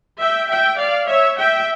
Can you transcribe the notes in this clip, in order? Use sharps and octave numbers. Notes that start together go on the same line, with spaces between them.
E5 G5
E5 G5
D5 F5
C#5 E5
E5 G5